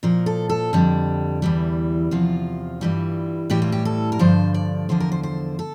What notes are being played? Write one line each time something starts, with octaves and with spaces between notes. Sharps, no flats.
A#2 F3 A#4
A4
A4
F2 D3 G3
E2 E3 G3
E2 C3 F3 F4
G2 E3 G3
A2 E3 G3 G4
F4
G4
A4
A#4
G2 D3 F3 C5
D5
E2 D3 F3 C5
A#4
C5
C5
A4